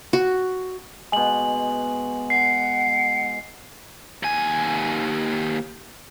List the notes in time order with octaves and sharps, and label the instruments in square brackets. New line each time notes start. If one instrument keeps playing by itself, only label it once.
[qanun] F#4
[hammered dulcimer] B2 G#3 [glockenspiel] G#5 F#7
[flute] F#5 [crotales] C7
[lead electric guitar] D#2 G#5